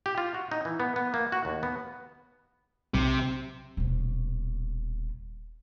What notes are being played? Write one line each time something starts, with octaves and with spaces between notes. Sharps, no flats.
G4
F4
F#4
D#4
E3
B3
B3
A#3
F#4
D#2
B3
B1 C3
D#1 B2